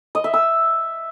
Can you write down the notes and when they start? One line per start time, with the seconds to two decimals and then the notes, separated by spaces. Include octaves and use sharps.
0.15 D#5
0.24 E5
0.34 E6